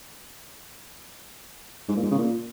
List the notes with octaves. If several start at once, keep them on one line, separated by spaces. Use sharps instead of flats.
G#2
A#2
G#2
C#3
A#2